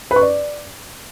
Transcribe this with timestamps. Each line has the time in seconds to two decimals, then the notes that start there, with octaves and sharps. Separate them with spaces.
0.11 B4
0.16 C#6
0.22 D5